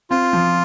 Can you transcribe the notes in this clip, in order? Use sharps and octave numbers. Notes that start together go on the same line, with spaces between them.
C4 F4
F3